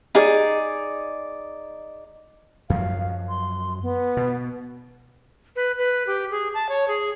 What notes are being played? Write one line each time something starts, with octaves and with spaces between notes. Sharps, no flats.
D#4 G#4 D5
F#2 F3 F#3 F5
C6
B3
B2
B4
B4
G4
G#4
A5
C#5
G#4